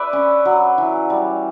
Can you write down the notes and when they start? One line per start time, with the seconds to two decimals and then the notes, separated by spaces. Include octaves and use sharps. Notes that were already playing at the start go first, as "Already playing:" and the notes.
Already playing: B4 D5 E5
0.13 C#4
0.45 F#3
0.78 E3
1.10 G3